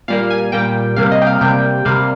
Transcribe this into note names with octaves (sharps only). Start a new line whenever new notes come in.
A#2 G3 A#3 F5
G#5
A#2 G3 A#3 G5
C3 G3 A#3 F5
D#5
G5
F5
C3 G3 A#3 G5
C3 G3 A#3 F5